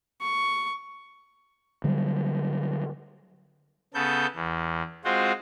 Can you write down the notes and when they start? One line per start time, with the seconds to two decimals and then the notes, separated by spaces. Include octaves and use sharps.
0.21 C#6
1.84 D3 F#3 G3
3.94 C#3 B3 A4 G6
4.35 E2
5.04 G#3 C4 F4 F#4 C5